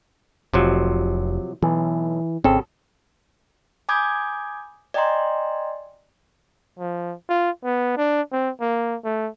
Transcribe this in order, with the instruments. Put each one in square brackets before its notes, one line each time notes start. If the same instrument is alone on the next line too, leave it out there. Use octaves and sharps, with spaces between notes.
[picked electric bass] F1 [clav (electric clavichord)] C3 F3 F#3
[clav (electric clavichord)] B1 [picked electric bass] E3
[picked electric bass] G#1 C4 [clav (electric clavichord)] C#3 A4
[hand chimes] G#5 B5 D6 D#6 G6 G#6
D5 D#5 G5 G#5 A#5 C6
[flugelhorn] F3
F4
B3
D4
C4
A#3
A3